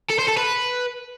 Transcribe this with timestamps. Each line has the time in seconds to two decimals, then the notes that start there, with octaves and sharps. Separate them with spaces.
0.10 A4
0.19 C5
0.28 A4
0.37 B4